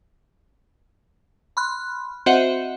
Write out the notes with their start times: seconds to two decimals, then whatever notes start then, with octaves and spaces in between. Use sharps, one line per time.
1.57 B5 C6 F6 F#6
2.26 C4 F#4 C5 D#5 E5 F#5